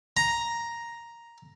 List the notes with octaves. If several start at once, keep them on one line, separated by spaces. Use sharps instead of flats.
A#5